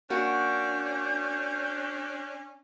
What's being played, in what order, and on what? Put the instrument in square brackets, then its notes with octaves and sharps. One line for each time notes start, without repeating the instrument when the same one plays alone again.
[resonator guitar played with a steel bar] A#3 F#4 [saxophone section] C#4 D4 [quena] G6